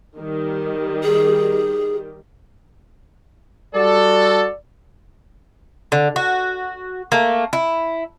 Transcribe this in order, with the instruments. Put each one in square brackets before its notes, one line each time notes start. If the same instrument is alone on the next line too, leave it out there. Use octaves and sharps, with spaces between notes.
[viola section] D#3 G3 G4
[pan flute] G#4
[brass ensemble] G3 F#4 A4 [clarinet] D5
[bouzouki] D3
F#4
A3 A#3
E4